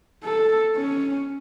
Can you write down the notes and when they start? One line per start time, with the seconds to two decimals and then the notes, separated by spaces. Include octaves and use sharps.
0.24 A4
0.77 C#4